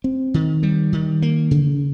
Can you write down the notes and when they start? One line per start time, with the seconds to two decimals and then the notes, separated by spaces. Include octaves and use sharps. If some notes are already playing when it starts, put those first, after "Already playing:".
0.04 C4
0.34 D#3
0.63 G3
0.93 D#3
1.22 A#3
1.51 C#3